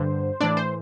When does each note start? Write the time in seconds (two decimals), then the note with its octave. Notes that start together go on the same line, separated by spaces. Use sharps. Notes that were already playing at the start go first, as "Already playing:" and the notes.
Already playing: G2 D3 C5
0.40 A2 E3 D4 D5
0.57 C5